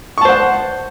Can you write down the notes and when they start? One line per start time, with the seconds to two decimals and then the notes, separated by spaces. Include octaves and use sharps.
0.18 C#6
0.21 A5
0.25 C5
0.29 F#5